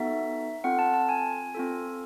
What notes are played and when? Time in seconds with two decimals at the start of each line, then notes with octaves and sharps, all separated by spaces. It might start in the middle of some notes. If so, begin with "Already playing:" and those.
Already playing: B3 D#4 F#4 A4 E5
0.64 C4 F4 A4 F#5
0.79 A5
0.94 A5
1.09 G#5
1.55 C4 F4 A4